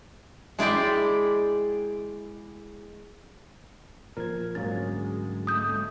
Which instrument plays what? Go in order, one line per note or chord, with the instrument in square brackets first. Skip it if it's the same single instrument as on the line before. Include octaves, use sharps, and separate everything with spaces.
[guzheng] G#3 E4 D5 G5 C6
[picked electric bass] A#2 F3 [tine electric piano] A#4 G#6
[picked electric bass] D2 G#2 [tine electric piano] F#3 A#3 C#4 [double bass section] G#3 [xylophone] A6
[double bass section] G#3 A3 [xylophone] D#6 G6